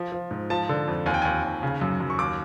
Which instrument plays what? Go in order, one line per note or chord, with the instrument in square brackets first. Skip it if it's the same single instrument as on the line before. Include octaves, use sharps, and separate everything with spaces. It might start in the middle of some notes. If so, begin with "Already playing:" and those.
Already playing: [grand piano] F3
F3
G#2
F3 A5
D3
F2
D#2 G#5
G5
D#2 G#5
D#2
C#3
F#2
F#2
C#6
D#2 D6